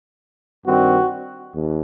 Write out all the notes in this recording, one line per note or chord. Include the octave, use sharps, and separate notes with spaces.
G2 D#3 G3 C4 F#4
D#2